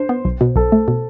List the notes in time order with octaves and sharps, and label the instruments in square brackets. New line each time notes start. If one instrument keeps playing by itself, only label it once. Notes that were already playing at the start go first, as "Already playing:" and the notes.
Already playing: [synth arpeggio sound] D4 [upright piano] C5
[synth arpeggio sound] B3
B1
B2
[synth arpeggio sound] B1 [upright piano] A4
[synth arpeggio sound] A3
B2